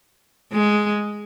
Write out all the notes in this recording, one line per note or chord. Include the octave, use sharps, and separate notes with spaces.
G#3